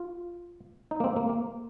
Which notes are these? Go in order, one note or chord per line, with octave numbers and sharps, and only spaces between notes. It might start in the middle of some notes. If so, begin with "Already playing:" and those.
Already playing: F4
D#4
A#3
C4
A#3
A#3